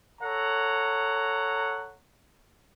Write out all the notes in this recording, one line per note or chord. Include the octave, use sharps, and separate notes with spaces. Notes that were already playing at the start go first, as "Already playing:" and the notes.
A4 C#5 F#5 A#5